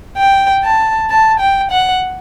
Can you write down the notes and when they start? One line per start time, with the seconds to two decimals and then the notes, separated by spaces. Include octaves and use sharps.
0.18 G5
0.64 A5
1.10 A5
1.40 G5
1.71 F#5